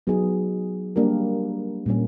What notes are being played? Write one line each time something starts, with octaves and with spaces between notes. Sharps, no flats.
F#3 B3 D#4 G#4
G3 A#3 D4 G4 A#4
A#2 G3 A#3 C#4